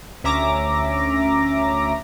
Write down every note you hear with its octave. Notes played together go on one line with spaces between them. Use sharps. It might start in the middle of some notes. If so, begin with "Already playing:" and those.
D2 C#4 E5 A#5 D6 A#6